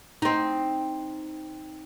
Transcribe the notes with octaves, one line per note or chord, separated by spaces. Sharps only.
C4 D#4